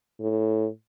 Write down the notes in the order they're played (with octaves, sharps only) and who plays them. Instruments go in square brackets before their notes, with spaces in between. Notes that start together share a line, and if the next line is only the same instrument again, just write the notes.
[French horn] A2